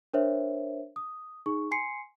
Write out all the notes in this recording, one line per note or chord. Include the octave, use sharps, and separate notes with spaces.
D4 A#4 C5 C#5 E5
D#6
D#4 G#4 C#6
G#5 C6 C7 C#7